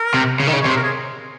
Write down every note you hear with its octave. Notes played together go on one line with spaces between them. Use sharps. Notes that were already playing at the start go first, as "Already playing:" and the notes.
Already playing: A#4
C3
C#3
D#3
C#3
C#5
C3
C5
A#4
G#4